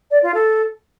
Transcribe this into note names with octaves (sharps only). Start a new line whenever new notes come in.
D5
F4
A4